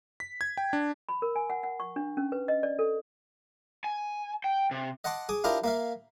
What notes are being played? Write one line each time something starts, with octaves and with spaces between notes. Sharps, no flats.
B6
G#6
G5
D4
B5
A#4
G#5
F#5
F#5
C#6
D4
C#4
B4
D#5
D5
A4
G#5
G5
C3
D#5 F#5 A5 C6 D6
G#4 D6 D#6
D4 E4 F4 G4 A#4 D#5
A#3 E5 F5